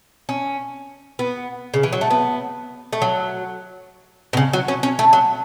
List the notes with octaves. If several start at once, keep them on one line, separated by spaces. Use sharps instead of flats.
C#4
B3
C#3
E3
F#3
A3
B3
A3
F#3
B2
C#3
F#3
C#4
C#4
A3
F#3